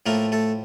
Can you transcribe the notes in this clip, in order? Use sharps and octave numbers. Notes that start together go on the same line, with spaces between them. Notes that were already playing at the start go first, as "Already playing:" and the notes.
A2 F3 A3 A#3 A#4
A3 A4